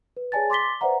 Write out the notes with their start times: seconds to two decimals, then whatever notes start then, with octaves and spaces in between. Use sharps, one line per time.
0.17 B4
0.32 G#4 C#5 D5 G#5 A5 A6
0.50 C6 D6 A6 B6 G7
0.81 B4 C5 D5 E5 F#5 A#5